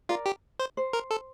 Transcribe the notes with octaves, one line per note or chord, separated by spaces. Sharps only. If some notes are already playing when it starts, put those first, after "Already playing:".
F4 A#4 D5
G4
C5
C5
A#4
A4